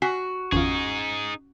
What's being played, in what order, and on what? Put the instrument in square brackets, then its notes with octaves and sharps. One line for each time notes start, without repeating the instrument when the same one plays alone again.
[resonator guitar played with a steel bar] F#4 [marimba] G#5 [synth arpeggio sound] B6 C7
[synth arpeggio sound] G1 E2 F4 [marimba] C#4 [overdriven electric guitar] D#4 G#4